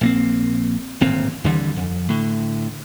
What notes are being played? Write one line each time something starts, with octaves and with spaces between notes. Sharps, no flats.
A#1 A#3 C4
D1 G#1 A#2 C4
D#2 D3 E3 G3
F2
A2 D3